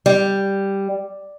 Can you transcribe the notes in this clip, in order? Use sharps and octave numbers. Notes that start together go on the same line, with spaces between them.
G3